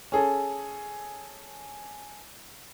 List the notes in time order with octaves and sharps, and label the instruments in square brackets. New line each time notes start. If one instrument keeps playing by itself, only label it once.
[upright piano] C#4 G#4 A4